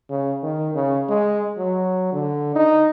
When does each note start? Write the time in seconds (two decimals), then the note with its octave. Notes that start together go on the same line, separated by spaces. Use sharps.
0.10 C#3
0.43 D#3
0.75 C#3
1.09 G#3
1.58 F#3
2.13 D3
2.56 D#4